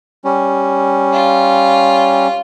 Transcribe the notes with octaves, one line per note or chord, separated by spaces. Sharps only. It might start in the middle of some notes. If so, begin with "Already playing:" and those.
G3 C#4
F4